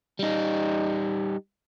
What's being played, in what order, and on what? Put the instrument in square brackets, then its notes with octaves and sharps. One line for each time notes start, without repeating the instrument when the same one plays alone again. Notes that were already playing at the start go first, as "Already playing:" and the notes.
[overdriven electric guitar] G3 D#4